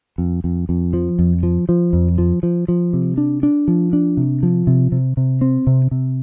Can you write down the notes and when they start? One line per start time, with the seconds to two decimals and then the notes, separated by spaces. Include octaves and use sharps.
0.18 F2
0.44 F2
0.69 F2
0.93 F3
1.19 F2
1.43 F3
1.69 F3
1.93 F2
2.18 F3
2.43 F3
2.68 F3
2.93 C3
3.18 D4
3.43 D4
3.68 F3
3.93 D4
4.17 C3
4.43 F3
4.67 C3
4.92 C3
5.17 C3
5.41 C4
5.67 C3
5.91 C3